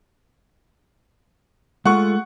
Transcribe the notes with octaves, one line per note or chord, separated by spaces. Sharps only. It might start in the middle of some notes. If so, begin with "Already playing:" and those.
G#3 A3 F4 F#5 C#6